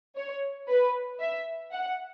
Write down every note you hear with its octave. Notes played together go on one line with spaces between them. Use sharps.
C#5
B4
E5
F#5